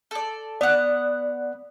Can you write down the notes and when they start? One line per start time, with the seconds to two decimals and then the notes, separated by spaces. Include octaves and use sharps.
0.11 A4 D5
0.61 B3 D5 F#5